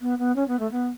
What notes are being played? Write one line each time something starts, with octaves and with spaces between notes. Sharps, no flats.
B3
B3
C#4
B3
A3
B3